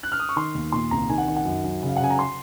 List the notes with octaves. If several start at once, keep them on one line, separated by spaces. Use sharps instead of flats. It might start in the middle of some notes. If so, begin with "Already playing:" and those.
F#6
F6
D#6
C#6
D#3 C6
D#2
A#2 C6
C2 A#5
D#3 G#5
F#5
D#3
F#5
F#2
F#2
C#3
F5
F#5
C#3 G#5
A#5
C6